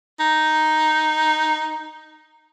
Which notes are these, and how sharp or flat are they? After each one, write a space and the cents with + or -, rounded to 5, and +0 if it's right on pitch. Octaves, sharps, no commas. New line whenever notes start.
D#4 +0